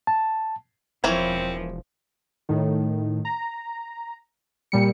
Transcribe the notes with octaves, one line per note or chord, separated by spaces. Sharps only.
A5
E1 E3 F3 C4 A#4 C#5
A2 D#3
A#5
A#2 G3 C#7